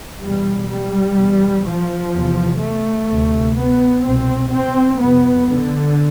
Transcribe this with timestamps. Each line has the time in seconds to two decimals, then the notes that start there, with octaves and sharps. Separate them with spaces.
0.20 E2 G3
0.26 B2
0.69 G3
1.17 E2 B2
1.65 F3
2.13 E2 C3
2.60 A3
3.08 D2 C3
3.56 B3
4.04 C2 B2 C4
4.52 C4
5.00 F2 C3 B3
5.48 D3